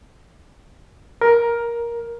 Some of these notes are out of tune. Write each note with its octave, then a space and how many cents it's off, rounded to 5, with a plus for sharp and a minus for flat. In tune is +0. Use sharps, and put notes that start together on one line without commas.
A#4 +10